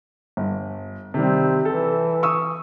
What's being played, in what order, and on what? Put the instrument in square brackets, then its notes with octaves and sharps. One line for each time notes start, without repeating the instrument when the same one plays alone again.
[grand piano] G1
[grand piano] C3 D#3 G3 [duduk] C4
[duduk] E3 [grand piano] A4
[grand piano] C#6 D#6 E6